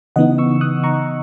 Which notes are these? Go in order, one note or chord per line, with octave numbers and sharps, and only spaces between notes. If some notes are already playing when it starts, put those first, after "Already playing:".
C#3 E3 B3 D#4 D#5 F#5
C#6 E6
D#6 F#6
A#5 C#6